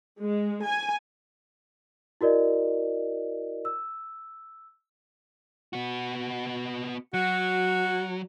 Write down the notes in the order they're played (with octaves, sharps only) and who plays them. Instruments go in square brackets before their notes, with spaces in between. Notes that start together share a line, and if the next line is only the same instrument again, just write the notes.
[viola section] G#3
G#5
[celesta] E4 F#4 A#4 D5 D#5
E6
[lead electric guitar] B3 F#4
[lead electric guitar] F#3 [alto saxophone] F#4